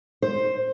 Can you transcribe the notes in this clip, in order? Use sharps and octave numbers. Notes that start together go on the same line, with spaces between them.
C5